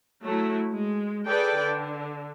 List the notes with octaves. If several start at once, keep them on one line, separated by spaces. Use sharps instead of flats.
F#3 A3 E4
G#3
G#4 A4 B4 D5 G5
D3